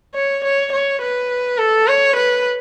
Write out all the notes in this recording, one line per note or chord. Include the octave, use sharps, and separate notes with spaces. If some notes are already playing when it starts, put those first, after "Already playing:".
C#5
C#5
C#5
B4
A4
C#5
B4